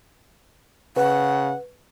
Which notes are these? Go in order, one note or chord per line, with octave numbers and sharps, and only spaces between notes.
C#3 B4 F#5